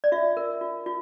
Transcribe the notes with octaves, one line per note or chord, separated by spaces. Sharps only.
D5
F4 E5
A#4
F4
F4